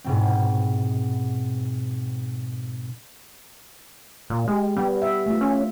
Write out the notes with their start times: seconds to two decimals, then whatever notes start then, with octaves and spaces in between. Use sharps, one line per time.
0.04 G#2 B2 C4
4.30 A#2
4.48 G#3 G4
4.77 G3 B3
5.02 E5
5.26 A3 F4
5.41 C#4